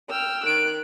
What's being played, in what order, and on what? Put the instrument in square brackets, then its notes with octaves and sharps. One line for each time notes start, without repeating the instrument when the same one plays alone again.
[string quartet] G5 E6 F6
[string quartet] D#3 F#6 [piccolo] D7